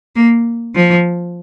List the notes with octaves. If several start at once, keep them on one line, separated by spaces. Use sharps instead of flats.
A#3
F3